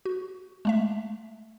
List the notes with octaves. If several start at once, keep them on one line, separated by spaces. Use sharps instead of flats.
F#4
G#3 A3 E5